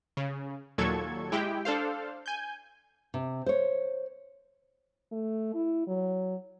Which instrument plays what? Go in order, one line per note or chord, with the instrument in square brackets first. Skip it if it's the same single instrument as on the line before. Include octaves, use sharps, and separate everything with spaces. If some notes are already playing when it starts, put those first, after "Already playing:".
[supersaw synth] C#3
D#2 A#2 F#3 A4 C#6 G#6
G#3 E4 G4 G5
D4 A4 C5 F5
G#5 G6
[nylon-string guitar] C3
C5 C#5
[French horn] A3
E4
F#3